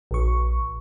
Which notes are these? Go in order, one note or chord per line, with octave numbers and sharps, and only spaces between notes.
A#1 C#6